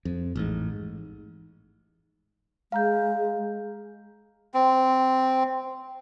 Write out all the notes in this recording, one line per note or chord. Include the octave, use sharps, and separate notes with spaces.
F2
A1 G#2
G#3 F5 A#5 G6
C4